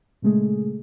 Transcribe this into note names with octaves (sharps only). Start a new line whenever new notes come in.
A#2 C#3 G#3 A3 G#4